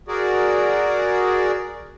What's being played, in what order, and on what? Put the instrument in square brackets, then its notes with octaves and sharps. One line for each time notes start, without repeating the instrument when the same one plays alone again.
[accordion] F#4 G#4 A#4 D5